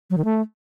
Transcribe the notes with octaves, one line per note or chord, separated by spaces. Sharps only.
F#3
D#3
A3